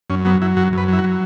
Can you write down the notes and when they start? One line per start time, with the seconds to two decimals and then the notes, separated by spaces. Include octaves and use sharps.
0.10 F#2 C#4
0.25 F#3 B3
0.42 F#3 E4
0.57 F#2 F#4
0.73 F#2 B4
0.88 F#3 E4
0.99 F#4
1.04 F#3